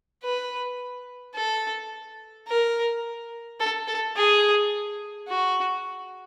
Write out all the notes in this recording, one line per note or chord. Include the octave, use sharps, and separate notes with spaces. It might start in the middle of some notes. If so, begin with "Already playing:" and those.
B4
A4
A#4
A4
A4
G#4
F#4